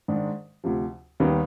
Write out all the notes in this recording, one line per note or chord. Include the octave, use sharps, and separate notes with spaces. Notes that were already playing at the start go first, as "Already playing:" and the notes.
G#2 D#3 G#3 D4
D2 C3 F3
D#2 D#3 G3 B3 D#4